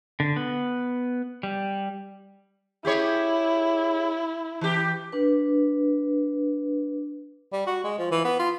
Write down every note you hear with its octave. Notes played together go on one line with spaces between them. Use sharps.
D3
B3
G3
E4 G4 G#4 C#5
E3 G4
D4 B4
G3
F#4
G#3
F3
E3
B3
F4